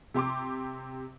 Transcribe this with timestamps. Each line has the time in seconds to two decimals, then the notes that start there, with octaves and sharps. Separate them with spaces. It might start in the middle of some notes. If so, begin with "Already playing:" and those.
0.14 C3 G4 C6 D6